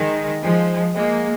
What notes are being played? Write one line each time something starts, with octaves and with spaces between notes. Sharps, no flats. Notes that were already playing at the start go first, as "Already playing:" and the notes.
Already playing: D#3 G#3
F3 G#3
G#3 A#3